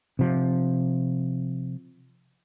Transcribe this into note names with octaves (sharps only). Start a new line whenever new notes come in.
C3 F3